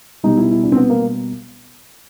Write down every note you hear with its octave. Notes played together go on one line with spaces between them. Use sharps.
B2 G3 D#4
E4
E4
D4
C4
B3
A#3